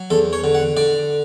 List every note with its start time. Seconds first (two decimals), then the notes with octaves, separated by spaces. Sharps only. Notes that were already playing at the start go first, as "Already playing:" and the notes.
Already playing: F#3
0.10 E2 A4
0.33 C#5
0.44 D3
0.55 F#5
0.77 D3 D5